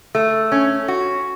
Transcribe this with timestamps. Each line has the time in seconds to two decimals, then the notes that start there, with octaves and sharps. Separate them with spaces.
0.15 A3
0.52 C#4
0.88 F#4